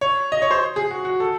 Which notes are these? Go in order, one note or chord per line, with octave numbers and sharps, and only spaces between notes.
C#5
D#5
C#5
C5
G#4
F#4
F#4
A4